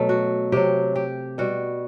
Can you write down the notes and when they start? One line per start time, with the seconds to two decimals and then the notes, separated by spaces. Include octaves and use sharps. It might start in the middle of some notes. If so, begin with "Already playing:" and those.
Already playing: B2 F#3 A3
0.09 F#4
0.52 C3 F#3 G4
0.95 G4
1.38 B2 G3 F#4